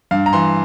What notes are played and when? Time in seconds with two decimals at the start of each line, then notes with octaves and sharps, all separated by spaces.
0.11 G2 F5
0.26 A#5
0.33 E3 C6